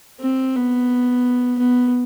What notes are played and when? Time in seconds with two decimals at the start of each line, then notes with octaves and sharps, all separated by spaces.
0.21 C4
0.55 B3
1.59 B3